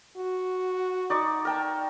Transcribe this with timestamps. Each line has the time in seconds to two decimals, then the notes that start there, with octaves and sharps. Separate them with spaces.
0.17 F#4
1.10 D#4 D5 C#6
1.45 A#4 G5 A5